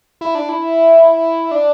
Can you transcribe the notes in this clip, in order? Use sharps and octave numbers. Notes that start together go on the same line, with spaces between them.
E4
D4
E4
D4